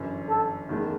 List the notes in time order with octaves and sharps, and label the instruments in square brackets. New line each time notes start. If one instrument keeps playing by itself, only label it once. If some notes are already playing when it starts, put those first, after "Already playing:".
Already playing: [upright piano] G1 F#2 E3
[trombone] A4
[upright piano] F#1 E2 D#3 A3